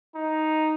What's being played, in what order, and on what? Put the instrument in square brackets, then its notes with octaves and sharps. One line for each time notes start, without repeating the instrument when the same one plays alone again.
[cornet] D#4